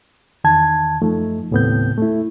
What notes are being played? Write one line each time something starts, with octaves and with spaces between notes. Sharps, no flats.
E2 D#3 A5 G#6
F#2 F3 A3 D#4
D#2 A2 C#3 B3 C4 G6
A3 E4